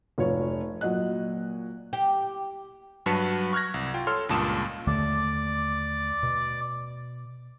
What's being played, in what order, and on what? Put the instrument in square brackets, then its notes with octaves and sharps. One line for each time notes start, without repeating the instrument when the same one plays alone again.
[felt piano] F1 F4 C#5
A#2 F#3 D#5 F#6
[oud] G4
[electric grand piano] G2 F#3 B4 A5 B6 C#7
C#6 F6 F#6 G#6 A#6
C2
F4 G5
A4 C#5 C6 F6
C#2 G2 A#2 A5 D#6 E7
[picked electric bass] D#2 D3 A3 [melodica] D5
[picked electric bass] B2